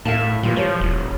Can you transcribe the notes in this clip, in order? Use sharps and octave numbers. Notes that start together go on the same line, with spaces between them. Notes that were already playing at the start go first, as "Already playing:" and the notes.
A2 E5 F5 A5
A#2 E3 F3 G3
F3 G4 C#5
E1